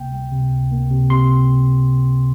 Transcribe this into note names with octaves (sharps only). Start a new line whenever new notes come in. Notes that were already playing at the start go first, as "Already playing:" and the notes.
Already playing: C#2 C3 A#3 G5
G3
C3
C#2
A#3
C3
C3 C6